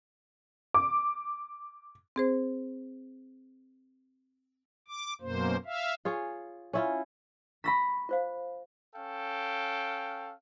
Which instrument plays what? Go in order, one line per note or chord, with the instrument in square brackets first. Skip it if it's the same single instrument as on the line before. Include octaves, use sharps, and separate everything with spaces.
[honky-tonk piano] D6
[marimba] C4 G#4 C5
[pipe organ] D6
F#2 B2 A#3 C5
E5 F5
[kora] F4 G#4 C#5
C#4 E4 F4
[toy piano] A#5 C#6 E6 [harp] B5 A#6 B6
[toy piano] F4 C5 F5
[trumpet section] C#4 A4 F5 G5